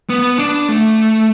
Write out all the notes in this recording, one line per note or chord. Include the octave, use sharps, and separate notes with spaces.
B3
D4
A3